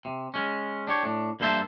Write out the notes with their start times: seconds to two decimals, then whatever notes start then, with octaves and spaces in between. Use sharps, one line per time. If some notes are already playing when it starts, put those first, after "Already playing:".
0.05 C3
0.34 G#3 C#4
0.87 D4 G4 C#5
1.03 A2 D4
1.40 G2 A#3 A4 C5 E5 A5